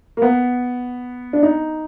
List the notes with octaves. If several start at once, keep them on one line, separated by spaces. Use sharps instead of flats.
A#3
B3
D4
D#4